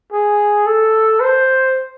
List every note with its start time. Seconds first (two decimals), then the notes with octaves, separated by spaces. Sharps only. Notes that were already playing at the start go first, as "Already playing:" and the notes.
0.12 G#4
0.66 A4
1.20 C5